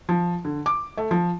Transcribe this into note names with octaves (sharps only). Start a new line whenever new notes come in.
F3
D3
D6
A3
F3